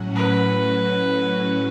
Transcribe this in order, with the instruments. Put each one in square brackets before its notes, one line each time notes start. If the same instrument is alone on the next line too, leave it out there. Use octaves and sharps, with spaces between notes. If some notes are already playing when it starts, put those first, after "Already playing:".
Already playing: [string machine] A2 F#3 C#4 F#4
[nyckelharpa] B4